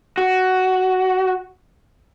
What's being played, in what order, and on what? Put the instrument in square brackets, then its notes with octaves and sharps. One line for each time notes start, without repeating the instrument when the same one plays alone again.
[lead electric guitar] F#4